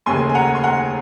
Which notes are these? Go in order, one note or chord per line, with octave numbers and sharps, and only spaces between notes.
F1 D#2 C#3 G#5 C6
G#5
F#5 A#5
C6
F#5 A#5